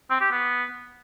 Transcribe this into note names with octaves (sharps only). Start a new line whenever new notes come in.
C4
G4
B3